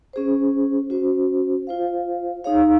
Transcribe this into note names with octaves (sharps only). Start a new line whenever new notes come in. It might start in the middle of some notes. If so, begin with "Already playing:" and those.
C#4 G#4 C5
C#4 F#4 C5
F4 C5 F5
D#4 G#4 C#5 F5